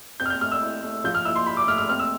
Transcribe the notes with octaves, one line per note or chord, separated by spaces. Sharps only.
C4 G6
F6
G6
A3 F6
E6
E4
A3
F3 G6
F6
E4 E6
C6
E4 B5
D6
A3 F6
F6
C4 F6
E6